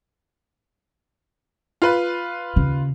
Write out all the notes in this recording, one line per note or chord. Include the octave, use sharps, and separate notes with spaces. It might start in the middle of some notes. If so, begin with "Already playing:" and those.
F4 B4
D#2 C#3